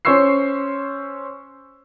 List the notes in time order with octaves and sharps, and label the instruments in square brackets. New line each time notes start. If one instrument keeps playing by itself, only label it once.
[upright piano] C#4 C5 C#5 C#6 E6 C7